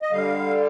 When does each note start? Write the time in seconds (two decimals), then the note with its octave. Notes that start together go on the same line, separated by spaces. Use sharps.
0.02 D#5
0.12 D3 G3 F5